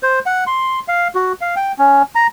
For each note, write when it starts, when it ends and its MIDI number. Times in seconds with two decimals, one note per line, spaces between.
0.03 0.19 72
0.26 0.44 78
0.47 0.80 84
0.88 1.08 77
1.15 1.33 66
1.41 1.55 77
1.56 1.72 79
1.78 2.02 61
2.15 2.27 82